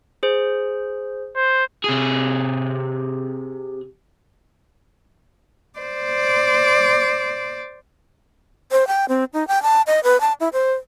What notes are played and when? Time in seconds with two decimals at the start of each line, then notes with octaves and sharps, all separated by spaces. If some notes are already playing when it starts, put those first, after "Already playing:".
0.23 G#4 C5
1.36 C5
1.84 C3 G#4
5.79 C5 D5
8.71 C5
8.87 G5
9.09 C4
9.33 D#4
9.48 G5
9.63 A5
9.87 D#5
10.04 B4
10.21 A5
10.40 E4
10.53 C5